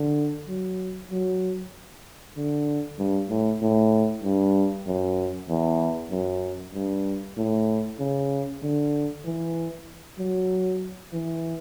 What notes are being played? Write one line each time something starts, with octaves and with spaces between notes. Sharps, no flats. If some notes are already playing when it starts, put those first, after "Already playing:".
Already playing: D3
F#3
F#3
D3
G2
A2
A2
G2
F#2
E2
F#2
G2
A2
C#3
D3
E3
F#3
E3